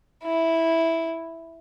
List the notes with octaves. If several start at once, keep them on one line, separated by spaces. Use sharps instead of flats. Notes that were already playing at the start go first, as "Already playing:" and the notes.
E4